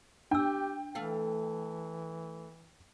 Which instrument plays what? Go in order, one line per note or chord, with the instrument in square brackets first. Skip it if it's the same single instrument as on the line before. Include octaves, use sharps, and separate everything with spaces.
[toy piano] D4 E6 [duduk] G4 [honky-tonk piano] G5
[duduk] E3 [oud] A3 F5